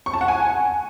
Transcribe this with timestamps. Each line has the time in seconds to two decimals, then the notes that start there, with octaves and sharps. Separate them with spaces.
0.06 C#6
0.14 A5
0.21 F#5
0.28 G#5